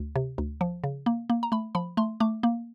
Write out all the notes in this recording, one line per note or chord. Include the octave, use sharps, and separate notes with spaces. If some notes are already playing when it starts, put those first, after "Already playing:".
Already playing: D2
C3
D2
F3
C#3
A#3
A#3
A#5
A3 B5
F3 B5
A3 C6
A3 D6
A#3